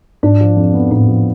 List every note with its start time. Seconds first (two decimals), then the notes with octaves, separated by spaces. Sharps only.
0.23 G#2 D4
0.40 F3
0.56 F2
0.74 B3
0.91 A2 D4
1.08 F3